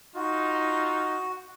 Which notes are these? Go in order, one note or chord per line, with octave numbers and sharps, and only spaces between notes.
D#4 F4 F#4